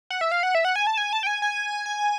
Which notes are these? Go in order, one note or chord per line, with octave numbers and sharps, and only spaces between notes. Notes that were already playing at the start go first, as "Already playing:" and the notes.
F#5
E5
F5
F#5
E5
F#5
G#5
A5
G#5
A5
G5
G#5
G#5
G#5